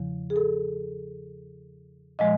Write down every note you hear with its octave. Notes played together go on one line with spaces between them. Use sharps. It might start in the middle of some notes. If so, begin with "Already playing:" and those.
Already playing: E2 C#3 F3
G#4
A4
A#2 F3 G#3 D#5